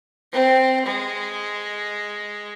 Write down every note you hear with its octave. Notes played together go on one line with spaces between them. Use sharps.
C4
G#3